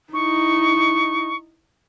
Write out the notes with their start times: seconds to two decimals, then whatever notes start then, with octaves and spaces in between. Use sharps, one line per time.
0.13 D#4 E4 C#6